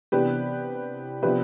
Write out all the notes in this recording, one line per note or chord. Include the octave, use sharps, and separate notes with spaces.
C3 E3 B3 D4 G4 B4
C3 F3 B3 D4 G4 B4